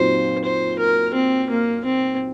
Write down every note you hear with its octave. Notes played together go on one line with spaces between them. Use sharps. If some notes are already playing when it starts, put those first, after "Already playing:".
Already playing: A#2 F#3 C4 D#4 C5
C5
A#4
C4
A#3
C4